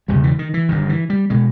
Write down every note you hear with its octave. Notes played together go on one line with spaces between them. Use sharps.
E1 E2 C#3 G3
E3
D#3
E3
G1 G2 D#3
E3
G3
B2 G#3